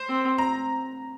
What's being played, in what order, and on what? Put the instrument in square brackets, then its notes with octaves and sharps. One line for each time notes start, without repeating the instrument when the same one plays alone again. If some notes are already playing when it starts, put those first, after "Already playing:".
Already playing: [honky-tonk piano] C5
[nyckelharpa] C4
[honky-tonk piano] A#5